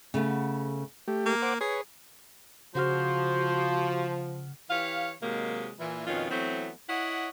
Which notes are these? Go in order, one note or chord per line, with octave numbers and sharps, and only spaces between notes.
C#3 A3 B3
A3 G4
A#3
C5 F#5 D6
G#4 B4 C#5
C#3 F3 F#4 C5 F#5 F6
E3 G4 C#5 F5
C3 D#3 F#3 G#3 A#3
A#2 E3
F2 B2 D#3 C#4 F4
E3 F#3 A3 B3 C4
E4 C#5 D#5 F#5